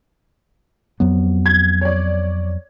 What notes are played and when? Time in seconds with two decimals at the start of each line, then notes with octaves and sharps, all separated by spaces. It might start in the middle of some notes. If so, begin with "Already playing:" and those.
1.00 F2 F#3 B3
1.46 G#6
1.81 C#5 D5